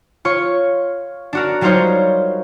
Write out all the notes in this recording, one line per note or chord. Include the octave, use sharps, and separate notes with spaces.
F4 C#5 C#6
D4 F#4 A#4
F#3 G3 D#4 F4 C5 C#5